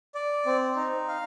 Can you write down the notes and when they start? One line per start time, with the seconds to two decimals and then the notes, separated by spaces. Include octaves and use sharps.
0.15 D5
0.46 C4
0.76 D#4
1.08 F5